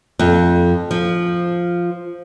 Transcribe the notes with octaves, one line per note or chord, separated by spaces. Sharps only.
F2
F3